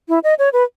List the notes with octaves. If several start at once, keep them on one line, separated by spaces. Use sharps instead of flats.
E4
D#5
C#5
B4